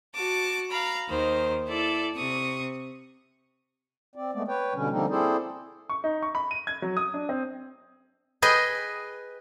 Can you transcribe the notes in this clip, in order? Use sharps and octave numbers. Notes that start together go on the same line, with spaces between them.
F#4 A5 D6
F5 A#5 B5
D#2 D#3 C5
E4 A4 D5
C3 C#6 D#6
C4 D5
G#3 A3 B3 D5
B4 C#5 G5
B2 D3 G3 C#4
D3 F3 G3 A#3 C4 D#4
C4 E4 G#4 A4 C5 D5
C#6
D#4
C#6
B5
D#7
G#6
F#3
D#6
D4
C4
G#4 B4 D#5 G5